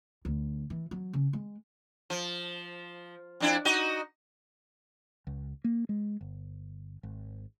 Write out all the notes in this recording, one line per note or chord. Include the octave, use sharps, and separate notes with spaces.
D2
E3
F#3
C#3
G#3
F3
F2 D4 E4
D#4 F#4 D#5
C#2
A#3
G#3
G1
G#1